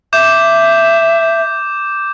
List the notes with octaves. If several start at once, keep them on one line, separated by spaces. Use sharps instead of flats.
E5 D6 G6 E7